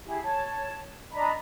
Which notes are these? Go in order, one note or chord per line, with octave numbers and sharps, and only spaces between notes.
E4 G4 G#4
C#5 A5
D4 D#5 A#5 B5